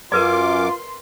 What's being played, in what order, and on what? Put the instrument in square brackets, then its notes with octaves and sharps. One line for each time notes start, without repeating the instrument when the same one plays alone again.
[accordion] F#2 D6 [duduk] F4 [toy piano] A#4 B4 D5 [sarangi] C6